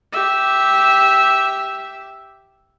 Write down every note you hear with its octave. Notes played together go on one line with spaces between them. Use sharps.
G4 E5